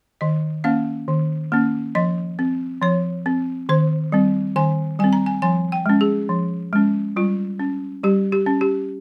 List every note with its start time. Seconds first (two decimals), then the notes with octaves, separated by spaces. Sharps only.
0.21 D#3 D#5
0.64 A#3 C#4 F5
1.08 D#3
1.52 A#3 C#4
1.95 F3 D#5
2.39 C4
2.82 F3 C#5
3.26 C4
3.69 D#3 C5
4.12 G3 C4
4.56 D#3 G#5
4.99 G3 C4 G#5
5.13 A#5
5.26 G#5
5.42 F3 G#5
5.72 G5
5.86 G#3 C#4
6.01 G#4
6.29 F3
6.73 G#3 C#4
7.16 G3 F4
7.59 C#4
8.03 G3 G4
8.32 G4
8.46 C#4
8.61 G4